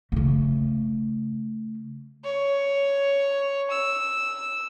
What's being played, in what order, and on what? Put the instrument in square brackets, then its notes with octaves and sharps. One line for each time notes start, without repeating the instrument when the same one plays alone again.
[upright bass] C#3 A3
[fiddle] C#5
E6